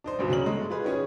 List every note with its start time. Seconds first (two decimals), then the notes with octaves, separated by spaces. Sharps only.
0.04 D4 D#4 C5
0.19 D2 G2 B2
0.30 C#3 F#3 C#4 F#7
0.46 G#3 A3
0.70 F4 G#4 B4
0.84 D#3 C#4 G#4